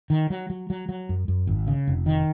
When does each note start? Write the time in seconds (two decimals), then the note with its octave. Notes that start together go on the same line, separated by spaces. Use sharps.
0.10 D#3
0.30 F#3
0.50 F#3
0.70 F#3
0.89 F#3
1.09 F#2
1.28 F#2
1.47 G#1
1.67 C#3
1.87 F1
2.06 D#3